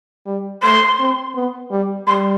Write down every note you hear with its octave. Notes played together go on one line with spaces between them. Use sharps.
G3
A3 C6
C4
B3
G3
G3 C6